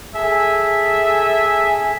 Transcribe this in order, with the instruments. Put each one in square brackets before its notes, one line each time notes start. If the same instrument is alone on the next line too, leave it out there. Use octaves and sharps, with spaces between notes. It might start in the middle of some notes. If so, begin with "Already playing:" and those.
[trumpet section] G#4 A4 E5 G#5